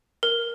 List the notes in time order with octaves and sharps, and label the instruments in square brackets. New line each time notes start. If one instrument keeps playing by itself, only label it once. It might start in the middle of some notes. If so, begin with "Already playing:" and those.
[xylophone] A#4